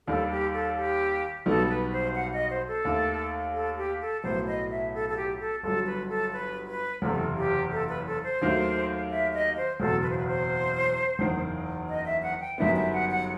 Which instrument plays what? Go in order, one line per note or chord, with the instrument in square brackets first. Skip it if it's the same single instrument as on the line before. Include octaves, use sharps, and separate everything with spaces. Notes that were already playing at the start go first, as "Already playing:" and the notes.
[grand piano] D#2 D#3 G3 [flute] A4
[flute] G4
A4
G4
[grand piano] B1 B2 G3 B3 D#4 [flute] A4
[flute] B4
C5
F#5
D#5
C5
A4
[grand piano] D#2 D#3 A3
[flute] A4
G4
A4
[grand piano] B1 A2 F#3 B3 [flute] C5
[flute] D#5
E5
A4
A4
G4
A4
[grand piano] G1 G2 F#3 [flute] A4
[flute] B4
A4
B4
B4
[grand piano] F#1 E2 C3 [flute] A4
[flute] G4
A4
B4
A4
C5
[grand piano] D#2 D#3 F#3 A3
[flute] E5
D#5
C5
[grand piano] F#1 E2 B2 [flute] A4
[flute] B4
C5
B4
C5
[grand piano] F#1 E2 D#3
[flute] D#5
E5
F#5
G5
[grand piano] G1 F#2 D#3 G3 B3 [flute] E5
[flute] E5
F#5
F#5